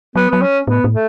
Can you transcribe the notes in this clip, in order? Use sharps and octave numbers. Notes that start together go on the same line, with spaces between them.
F#3 B3
F#3 B3
C#4
A2 B3
A2
A3